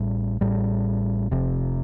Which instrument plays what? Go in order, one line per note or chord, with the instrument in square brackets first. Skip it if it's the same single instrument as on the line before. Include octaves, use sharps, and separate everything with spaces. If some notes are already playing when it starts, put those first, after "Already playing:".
Already playing: [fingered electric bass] A1 A2 G3
A1 A2 G3
F1 F2 C3